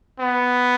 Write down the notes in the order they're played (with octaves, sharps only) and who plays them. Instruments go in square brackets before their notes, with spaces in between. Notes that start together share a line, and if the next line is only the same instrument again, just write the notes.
[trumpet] B3